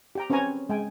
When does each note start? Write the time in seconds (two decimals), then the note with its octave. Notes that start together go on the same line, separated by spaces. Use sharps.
0.15 G4 G5 A#5
0.30 C4 C#4 B4 C#5 G#5 A#5
0.69 G#3 G5 G#5